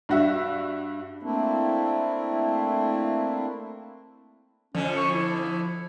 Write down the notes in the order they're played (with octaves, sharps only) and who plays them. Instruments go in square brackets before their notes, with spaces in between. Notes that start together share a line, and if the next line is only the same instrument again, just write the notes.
[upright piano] G2 F#4 E5
[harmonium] A3 A#3 C4 D4 E4
[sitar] F2 D3 [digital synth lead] F3 [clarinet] C#4
[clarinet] C#6
E4